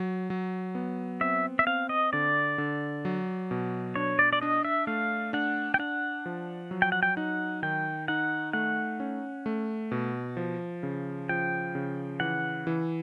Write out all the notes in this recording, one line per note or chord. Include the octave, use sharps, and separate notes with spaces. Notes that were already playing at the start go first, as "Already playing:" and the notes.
Already playing: F#3
F#3
B3
C4 E5
E5
C4 F5
D#5
D3 D5
D3
F#3
B2
D4 C#5
D5
D5
D4 D#5
E5
A3 F5
D4 F#5
G5
D4 F#5
F3
F#3
G5
F#5
G5
D#4 F#5
D#3 G5
D#4 F#5
A3 F#5
C#4
A3
B2
F3
C#3
F3 G5
C#3
E3 F#5
E3